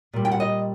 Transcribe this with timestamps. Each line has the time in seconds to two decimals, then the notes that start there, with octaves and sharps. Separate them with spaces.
0.13 A#2 G3
0.25 G5
0.31 F#5
0.40 D#5